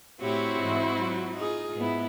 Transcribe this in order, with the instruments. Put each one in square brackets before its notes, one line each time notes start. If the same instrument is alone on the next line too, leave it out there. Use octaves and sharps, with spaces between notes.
[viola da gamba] A2 G4 C#5 [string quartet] C4 E4 F#4
[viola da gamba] G#2 E3
F#3 F4
D#4 F4 G#4
[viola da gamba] G#2 [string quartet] B3 E4